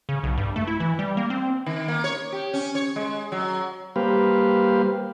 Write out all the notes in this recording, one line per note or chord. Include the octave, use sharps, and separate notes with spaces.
C#3
B1
G2
A3
E4
E3
G3
A#3
C4
D#3
A#3
C#5
G4
C#4
C#5
G#3
F#3
G3 A#3 G4 B4 C5 F5